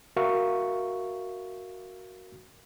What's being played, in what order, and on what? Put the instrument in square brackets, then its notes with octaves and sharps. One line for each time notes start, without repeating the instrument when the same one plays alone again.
[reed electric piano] F#4 A#4 E5 F5 C#6